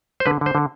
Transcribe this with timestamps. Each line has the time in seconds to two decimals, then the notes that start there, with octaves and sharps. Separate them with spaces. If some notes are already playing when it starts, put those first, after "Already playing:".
0.20 C5
0.26 D3 B4
0.41 D3
0.46 C5
0.55 D3